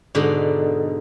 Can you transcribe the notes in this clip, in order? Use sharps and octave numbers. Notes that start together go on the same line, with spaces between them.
G#2 B2 D3 D#4 D5